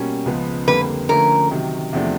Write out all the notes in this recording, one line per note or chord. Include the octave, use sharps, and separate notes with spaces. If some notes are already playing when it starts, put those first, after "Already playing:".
Already playing: B2 G3 A#3 C#4
C#2 C#3 F3 G#3 B3
F2 D3 G3 A#3 B4
D3 F3 A3 C#4 A#4
C3 D#3 F#3
E2 C3 F3 A3 D4